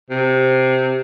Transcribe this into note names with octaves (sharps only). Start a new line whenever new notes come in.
C3